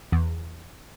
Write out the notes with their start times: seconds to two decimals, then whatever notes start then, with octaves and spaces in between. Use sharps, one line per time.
0.12 E2